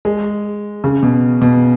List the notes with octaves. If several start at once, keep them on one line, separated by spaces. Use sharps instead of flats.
G#3
C#3
B2
B2